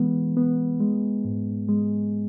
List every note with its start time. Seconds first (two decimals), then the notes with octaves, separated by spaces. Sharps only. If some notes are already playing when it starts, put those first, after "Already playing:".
Already playing: E3 G#3 B3
0.37 B3
0.80 G#3
1.25 G#2
1.69 G#3